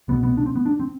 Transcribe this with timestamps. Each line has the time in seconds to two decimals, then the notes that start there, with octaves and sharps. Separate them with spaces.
0.08 C2 B2 B3
0.23 B3
0.37 D4
0.46 C4
0.56 B3
0.66 D4
0.80 C4